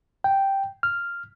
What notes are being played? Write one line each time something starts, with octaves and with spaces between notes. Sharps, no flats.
G5
F6